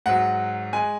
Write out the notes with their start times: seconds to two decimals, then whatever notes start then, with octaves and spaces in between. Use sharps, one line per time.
0.06 G#2 F#3 F#5
0.73 G#3 G#5